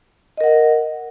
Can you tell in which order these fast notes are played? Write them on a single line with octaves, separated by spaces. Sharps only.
D#5 A#4 F#5